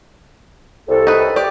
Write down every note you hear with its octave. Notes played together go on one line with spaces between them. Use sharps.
C2 A4
D#4 B4
G4 D5